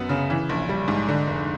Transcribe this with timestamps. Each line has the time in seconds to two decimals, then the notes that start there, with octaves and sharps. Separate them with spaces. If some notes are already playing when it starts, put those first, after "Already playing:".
Already playing: F#2 B3
0.09 C#3
0.30 E3
0.49 A#1
0.69 G3
0.88 G#2
1.08 D3
1.27 F1